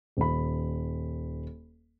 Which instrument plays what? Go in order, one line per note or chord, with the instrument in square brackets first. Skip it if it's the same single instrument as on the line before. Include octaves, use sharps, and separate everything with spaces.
[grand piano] D#1 B5